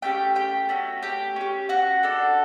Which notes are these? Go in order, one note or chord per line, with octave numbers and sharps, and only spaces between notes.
A3 C#4 G4 G5
G4 G5
A3 C#4 F#4
G4 G5
C#4 G4
F#4 F#5
D4 A4